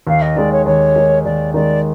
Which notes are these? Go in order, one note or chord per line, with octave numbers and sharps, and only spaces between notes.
D#2 F5
D#5
D#3 G#3 D5
C#5
D#2 C#5
D#3 G#3
D#2 D5
D#3 G#3 D5